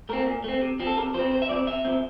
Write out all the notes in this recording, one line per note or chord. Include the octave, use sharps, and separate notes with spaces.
A3 C4 A#4
A#2
A3 C4
C3
F3 C4
A4
C3 A#4
F3 C4 C5
C3 C5
E5
F3 C4 D5
C3 E5
F3 C4